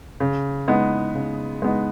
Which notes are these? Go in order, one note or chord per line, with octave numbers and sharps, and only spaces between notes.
C#3
G#3 B3 D#4
C#3
G#3 B3 D#4